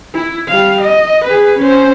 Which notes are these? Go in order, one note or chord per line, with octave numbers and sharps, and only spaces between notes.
E4
G3 F5
D#5
G#4 B4
C#4 C5